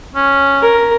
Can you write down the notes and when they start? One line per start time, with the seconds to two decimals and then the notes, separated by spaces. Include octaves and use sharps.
0.15 C#4
0.61 A#4